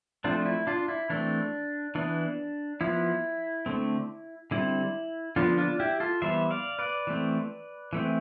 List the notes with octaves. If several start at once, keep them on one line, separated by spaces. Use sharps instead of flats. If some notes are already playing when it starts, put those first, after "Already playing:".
F3 A3 C4 D4 F4
E4
D4 F4
E4
E3 A3 C4 D4
E3 B3 D4
F3 B3 E4
D3 A3 C4
D3 G3 C4 E4
D3 F3 B3 D4 F4
D4 F4
E4 G4
F4 A4
E3 G3 B3 C5 E5
D5 F5
B4 D5
E3 A3 C4
E3 A3 C4